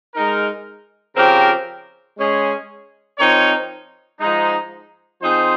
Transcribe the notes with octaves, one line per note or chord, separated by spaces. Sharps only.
G#3 D#4 A#4
C#3 F3 C4 G4 A#4
G#3 C#4 G#4
F3 C4 D#4 A#4 C#5
G#2 F3 G#3 D#4
F3 C4 D#4 G#4 C5